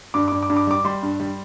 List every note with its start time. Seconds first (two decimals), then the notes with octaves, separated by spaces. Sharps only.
0.14 G2 D6
0.28 D6
0.32 G2
0.43 D6
0.50 G2
0.57 D6
0.67 G3 D6
0.85 G3 C6
1.03 G2
1.20 G3